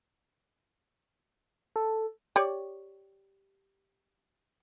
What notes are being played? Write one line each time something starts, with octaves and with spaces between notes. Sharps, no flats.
A4
G4 C#5 D5